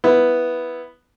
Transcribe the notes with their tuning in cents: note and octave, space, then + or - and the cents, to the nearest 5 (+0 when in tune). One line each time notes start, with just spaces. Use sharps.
B3 +0 E4 +0